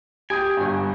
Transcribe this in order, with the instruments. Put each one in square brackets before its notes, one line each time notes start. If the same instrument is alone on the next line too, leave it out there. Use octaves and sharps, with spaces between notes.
[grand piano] G4 D#6 G6 [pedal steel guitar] G#5 [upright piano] D7
[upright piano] G1 G2